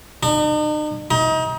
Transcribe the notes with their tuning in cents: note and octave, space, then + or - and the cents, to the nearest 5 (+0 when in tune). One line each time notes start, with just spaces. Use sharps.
D#4 -45
D#4 +30